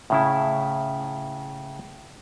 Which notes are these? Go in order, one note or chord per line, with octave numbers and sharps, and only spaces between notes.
A2 C#3 E4